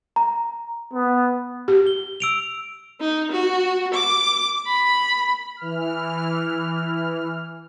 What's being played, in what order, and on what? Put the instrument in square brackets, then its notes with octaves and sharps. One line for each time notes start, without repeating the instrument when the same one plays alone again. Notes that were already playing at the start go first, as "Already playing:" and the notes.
[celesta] A#5
[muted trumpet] B3
[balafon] G4
[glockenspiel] G7
E6 D7 F7
[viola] D#4
F#4
D6
B5
[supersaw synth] E3 F6